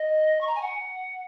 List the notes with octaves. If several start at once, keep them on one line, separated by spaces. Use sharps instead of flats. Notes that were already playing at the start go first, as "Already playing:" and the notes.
Already playing: D#5
C#6
A#5
G#5
F#5